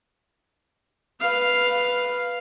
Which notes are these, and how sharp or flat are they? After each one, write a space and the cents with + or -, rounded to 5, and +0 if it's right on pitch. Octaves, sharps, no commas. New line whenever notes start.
B4 +0 F5 +0